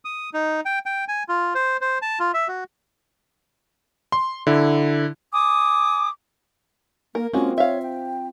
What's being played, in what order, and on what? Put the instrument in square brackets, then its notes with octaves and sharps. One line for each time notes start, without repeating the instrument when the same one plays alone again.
[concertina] D#6
D#4
G5
G5
G#5
F4
C5
C5
A5
F4
E5
F#4
[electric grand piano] C6
D3 E4
[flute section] G#5 D6 D#6
[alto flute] A#3 [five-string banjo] A#4
[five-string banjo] G#3 A#3 F#4 [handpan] C4 F4 [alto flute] C#4
[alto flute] C#5 [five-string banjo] E5 F5
[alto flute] G5